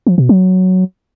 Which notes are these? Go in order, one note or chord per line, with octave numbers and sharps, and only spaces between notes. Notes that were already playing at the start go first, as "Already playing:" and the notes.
F3
B2
F#3